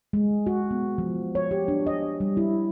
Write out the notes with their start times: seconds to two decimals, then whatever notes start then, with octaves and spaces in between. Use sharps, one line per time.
0.13 G#3
0.46 F#4
0.71 B3
0.98 F3
1.35 C#5
1.51 G4
1.68 D4
1.87 D#5
2.20 G3
2.37 E4